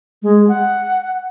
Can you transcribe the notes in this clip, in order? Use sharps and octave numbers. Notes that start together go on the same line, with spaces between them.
G#3
F#5